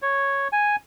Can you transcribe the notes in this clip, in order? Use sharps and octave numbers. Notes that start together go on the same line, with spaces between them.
C#5
G#5